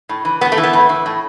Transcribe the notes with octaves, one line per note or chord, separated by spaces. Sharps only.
A2
E3
A2 B3
A3
E3
B3
A2
E3
A2